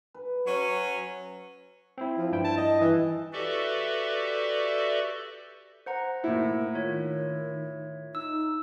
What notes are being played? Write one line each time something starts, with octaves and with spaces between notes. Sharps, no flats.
B4
F#3 C#4
C4 E4
F3
G2 E4 G5
A5
D#5
E3
F#4 G4 A4 B4 D5 E5
C5 F#5 A#5
A2 A#3 E4
D#3 F4 C#5
D#4 E6